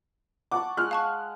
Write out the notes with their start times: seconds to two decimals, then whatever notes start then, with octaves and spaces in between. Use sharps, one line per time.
0.52 F#5 A5 C#6 D6
0.77 G#3 F6 F#6
0.91 F5 A5 C#6